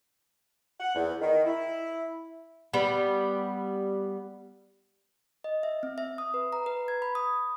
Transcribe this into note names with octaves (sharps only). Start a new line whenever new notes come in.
F#5
E2
D#3
E4
G3 B3
D#5
E5
C4
E5
D#6
B4
A#5
B4
G#6
B5
D#6